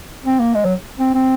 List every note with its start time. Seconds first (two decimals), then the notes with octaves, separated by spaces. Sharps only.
0.25 C4
0.39 A#3
0.54 G#3
0.65 F#3
0.99 C4
1.14 C4